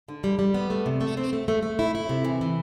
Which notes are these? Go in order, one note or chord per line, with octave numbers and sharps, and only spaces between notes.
D3
G3
G3
B3
A3
C3
A3
C4
A3
A3
A3
E4
E4
C3
E3
E3